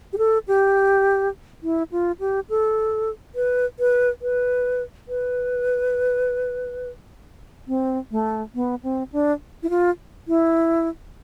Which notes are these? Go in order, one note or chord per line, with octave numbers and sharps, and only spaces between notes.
G4
A4
G4
E4
F4
G4
A4
B4
B4
B4
B4
C4
A3
B3
C4
D4
E4
F4
E4